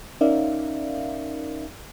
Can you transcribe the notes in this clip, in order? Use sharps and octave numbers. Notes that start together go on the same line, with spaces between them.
C#4 D#4 A#4 D5 E5 F5